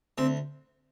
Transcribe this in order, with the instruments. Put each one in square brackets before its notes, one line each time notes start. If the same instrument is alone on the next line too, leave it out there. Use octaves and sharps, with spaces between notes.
[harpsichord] D2 C4